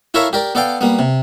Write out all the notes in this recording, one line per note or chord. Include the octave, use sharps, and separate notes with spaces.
E4 A4 A#4 C#5 E5 F5
G4 A#4 D5
B3 A4 D5 F5 G5
G3 A#3 B3
C3